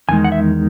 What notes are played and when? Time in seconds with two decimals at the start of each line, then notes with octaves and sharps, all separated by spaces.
0.09 E2 D#3 G#3 G#5
0.24 F#5
0.32 E5